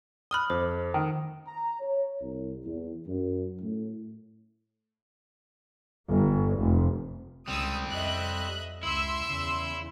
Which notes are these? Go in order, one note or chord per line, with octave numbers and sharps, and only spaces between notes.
B5 D#6 F6 F#6 G7
F2 C5
D#3
A#5
C#5
C2
E2
F#2
A2
G1
F1
C#2 G3 C4 D#6 E6
F2 D#5 E5 F#6
C#2 E4 E5 C6 E6
E2 C#3